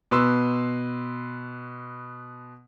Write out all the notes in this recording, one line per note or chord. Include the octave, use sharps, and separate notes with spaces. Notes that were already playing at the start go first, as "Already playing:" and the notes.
B2 B4 C6 E6